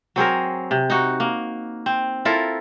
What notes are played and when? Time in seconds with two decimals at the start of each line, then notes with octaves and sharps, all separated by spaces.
0.16 F#3 C4 G#4 A#4
0.71 C3
0.90 D#4 F#4
1.20 A#3
1.86 C4
2.25 E4 F4 A4 A#4